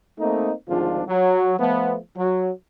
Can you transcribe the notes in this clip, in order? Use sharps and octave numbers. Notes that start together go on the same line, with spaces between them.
A3 A#3 C4 D#4
G#1 D2 G#2 F3 D4 F4
F#3
F3 A3 B3
F#3